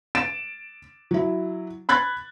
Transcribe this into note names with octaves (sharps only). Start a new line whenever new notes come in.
A6 D7 E7
F#3 E4
B5 F#6 G#6 A6